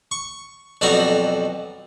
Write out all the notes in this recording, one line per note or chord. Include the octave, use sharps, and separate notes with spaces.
C#6
B1 F2 G3 C4 F#4 A#5